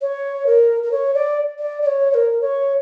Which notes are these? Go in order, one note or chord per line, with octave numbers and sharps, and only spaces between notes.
C#5
A#4
A#4
C#5
D5
D5
D5
C#5
C#5
A#4
C#5